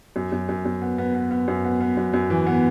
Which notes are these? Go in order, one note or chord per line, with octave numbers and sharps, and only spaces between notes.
F#2
F#2
F#2
F#2
B3
B3
B3
B3
F#2
B3
B3
F#2
F#2
E3
B3